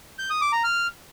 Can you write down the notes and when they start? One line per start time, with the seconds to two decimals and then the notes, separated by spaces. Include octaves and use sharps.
0.19 G6
0.30 D#6
0.41 D6
0.53 A#5
0.64 F6